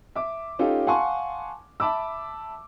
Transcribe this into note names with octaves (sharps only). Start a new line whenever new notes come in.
E5 D6
C#4 D#4 F4 G4 A4
F5 F#5 G#5 A5 C6 C#6
E5 A5 B5 D6 E6